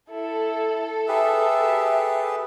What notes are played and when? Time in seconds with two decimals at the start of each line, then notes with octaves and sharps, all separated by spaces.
0.10 E4 A4
1.08 G4 G#4 B4 E5